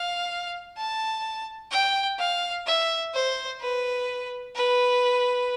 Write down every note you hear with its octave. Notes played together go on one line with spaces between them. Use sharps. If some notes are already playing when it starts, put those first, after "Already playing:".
Already playing: F5
A5
G5
F5
E5
C5
B4
B4